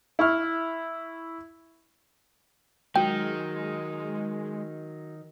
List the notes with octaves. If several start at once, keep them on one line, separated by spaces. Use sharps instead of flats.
E4 C#6 F6
D#3 F#3 G#3 G5